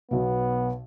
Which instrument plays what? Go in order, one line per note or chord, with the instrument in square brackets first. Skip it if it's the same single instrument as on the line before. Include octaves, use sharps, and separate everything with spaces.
[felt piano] B1 B2 [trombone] B3